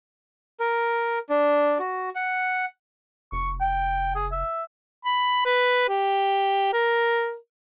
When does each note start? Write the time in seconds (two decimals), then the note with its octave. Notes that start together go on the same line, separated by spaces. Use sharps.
0.60 A#4
1.30 D4
1.79 F#4
2.16 F#5
3.32 F1 C#6
3.61 G5
4.16 G#4
4.32 E5
5.05 B5
5.45 B4
5.89 G4
6.73 A#4